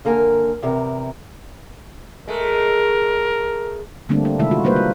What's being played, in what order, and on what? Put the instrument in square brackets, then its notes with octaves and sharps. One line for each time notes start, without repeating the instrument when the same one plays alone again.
[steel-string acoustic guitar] D3 A#3 A#4 G#5
E2 C3 A#4
[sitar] G#3 A3 [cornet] A#4
[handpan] D3 G3 A3 A#3 C4 D4
D4
C3 D#3 G#3 A3 E4 E5
F4 F#4
G3 A#3 B4 C5
F4